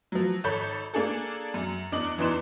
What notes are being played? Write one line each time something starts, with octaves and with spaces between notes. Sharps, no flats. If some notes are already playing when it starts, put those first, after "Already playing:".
F3 F#3
G#1 A4 C#5 B5 G6
A#3 D4 G#4 A4
F#2
E2 D4 D#5 D6 F#7
E2 E3 D4 D#4 C6 E7